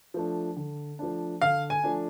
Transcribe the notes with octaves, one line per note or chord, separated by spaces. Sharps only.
F3 A3 D4
D3
F3 A3 D4
D3 F5
G#5
F3 A3 D4